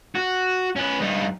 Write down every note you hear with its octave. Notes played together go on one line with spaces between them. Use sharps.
F#4
C#4 B4
G2 D#4